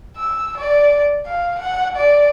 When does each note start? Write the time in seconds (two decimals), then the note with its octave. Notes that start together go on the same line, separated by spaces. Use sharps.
0.16 E6
0.58 D5
1.26 F5
1.59 F#5
1.96 D5